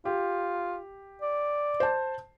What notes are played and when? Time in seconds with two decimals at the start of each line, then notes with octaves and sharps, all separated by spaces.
0.05 F4 G4
1.21 D5
1.80 C5 A5